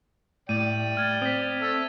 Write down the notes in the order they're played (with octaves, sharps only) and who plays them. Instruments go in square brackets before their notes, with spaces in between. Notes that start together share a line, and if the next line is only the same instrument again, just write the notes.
[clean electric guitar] A2 [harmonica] D5 G5 [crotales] D#7
[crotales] F6 G#6 A6
[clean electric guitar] C4 [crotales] D#6 A6 B6
[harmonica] A4 E5